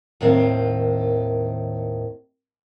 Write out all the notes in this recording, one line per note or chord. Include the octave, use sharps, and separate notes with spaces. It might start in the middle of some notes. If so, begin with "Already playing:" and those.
D#2 A2 D#3 C4